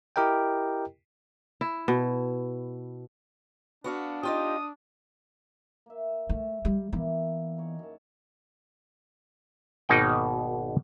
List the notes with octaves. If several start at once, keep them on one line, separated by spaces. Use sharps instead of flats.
E4 G4 A#4 D#5 G5
E4
B2
B3 D4 F#4 F5
D#4 F4 G4 D#6
A#3 E5
A3 E5 A5
G3
E3 G3 A#3 B3 E4
D#4 G#4 C#5
F#2 A5
G#1 B2 A#3 D#4 F#5 G5